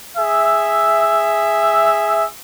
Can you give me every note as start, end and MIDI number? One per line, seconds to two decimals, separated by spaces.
0.17 2.25 68
0.17 2.25 76